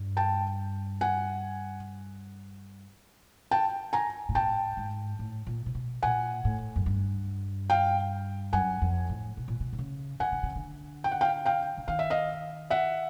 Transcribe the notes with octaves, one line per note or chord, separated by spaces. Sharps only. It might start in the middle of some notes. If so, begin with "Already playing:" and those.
Already playing: G2
G5 A5
F#5 G#5
G5 A5
G#5 A#5
A#2
A2 G5 A5
G#2
A2
A#2
C3
B2
A#2 F#5 G#5
A2
F#2
G2
F5 G5
F#2 F#5 G#5
F2
A2
B2
A#2
B2
C3
C#3
D#3 F#5 G#5
D3
C#3
D3
G5
F#5
F5 G5
F5 G5
D3
D#3 F5
E5
D#5 F5
E5 F#5